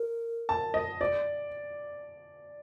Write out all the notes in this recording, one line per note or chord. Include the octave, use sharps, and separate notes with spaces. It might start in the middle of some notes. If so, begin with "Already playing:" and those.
Already playing: A#4
A5
D#5
D5